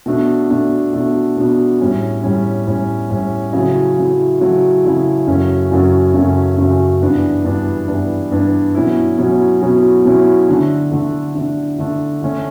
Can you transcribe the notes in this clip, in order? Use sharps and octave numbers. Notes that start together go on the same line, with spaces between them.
B2 A3 D4
B2 A3 D4
B2 A3 D4
B2 A3 D4
A2 G3 C#4
A2 G3 C#4
A2 G3 C#4
A2 G3 C#4
C#3 F#3 A3 E4
C#3 F#3 A3 E4
C#3 F#3 A3 E4
C#3 F#3 A3 E4
F#2 C#3 F#3 A3 C#4
F#2 C#3 F#3 A3 C#4
F#2 C#3 F#3 A3 C#4
F#2 C#3 F#3 A3 C#4
G2 E3 B3 D4
G2 E3 B3 D4
G2 E3 B3 D4
G2 E3 B3 D4
B2 F#3 C#4 E4
B2 F#3 C#4 E4
B2 F#3 C#4 E4
B2 F#3 C#4 E4
D3 A3 D4
D3 A3 D4
D3 A3 D4
D3 A3 D4
D3 A3 C#4